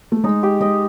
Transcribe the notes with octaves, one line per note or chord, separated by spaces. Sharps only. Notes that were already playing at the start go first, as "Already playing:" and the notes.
A3
G#3 D#4
G4
G#3 D#5